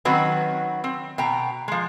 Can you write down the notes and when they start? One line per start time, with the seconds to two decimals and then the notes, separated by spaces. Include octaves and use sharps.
0.05 D#3 F#3 C4 C#4 F#4 B4
0.84 C4
1.18 B2 G5 A#5
1.68 F3 G#3